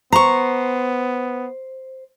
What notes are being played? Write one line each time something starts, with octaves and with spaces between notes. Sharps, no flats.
B3 C5 A#5 C#6